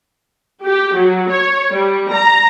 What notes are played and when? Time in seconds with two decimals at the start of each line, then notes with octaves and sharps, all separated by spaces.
0.64 G4
0.96 F#3
1.30 C#5
1.73 G3
2.12 A#5